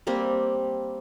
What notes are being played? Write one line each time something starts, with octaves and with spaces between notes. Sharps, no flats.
G3 A#3 C4 G4